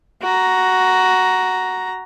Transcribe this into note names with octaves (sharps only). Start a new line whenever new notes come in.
F#4 A#5